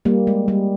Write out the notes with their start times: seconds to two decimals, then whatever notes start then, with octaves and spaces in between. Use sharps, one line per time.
0.05 G3 A#3
0.27 G#3
0.48 G3